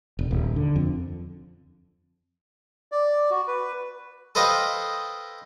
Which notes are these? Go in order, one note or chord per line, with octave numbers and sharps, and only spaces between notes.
E1
D#1
D3
F2
D5
F#4
B4
A4 B4 C5 D#5 F5 G5